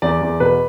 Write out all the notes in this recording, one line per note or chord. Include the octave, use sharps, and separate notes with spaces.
E2 D5
E2
B2 B4